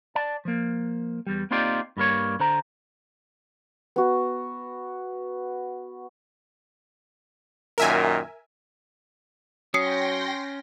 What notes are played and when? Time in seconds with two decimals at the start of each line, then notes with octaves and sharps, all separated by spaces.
0.15 D5 A5
0.45 F3 A#3
1.27 E2 G3
1.51 A#3 C4 D#4 F4 G4 D5
1.97 G2 G3 A#3 C#5
2.40 D3 C5 A#5
3.96 B3 F#4
7.78 F#2 A#2 D#3 A#4 E5 G#5
9.74 F#3 C#4 G5 C6 D#6 A#6 C7 C#7